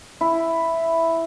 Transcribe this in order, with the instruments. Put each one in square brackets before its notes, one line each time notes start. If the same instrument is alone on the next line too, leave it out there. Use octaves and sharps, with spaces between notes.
[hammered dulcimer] E4